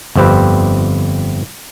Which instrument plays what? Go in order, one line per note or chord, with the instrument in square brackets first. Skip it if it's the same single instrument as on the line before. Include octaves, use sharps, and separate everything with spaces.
[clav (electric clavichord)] G1 F2 C4 G4 B4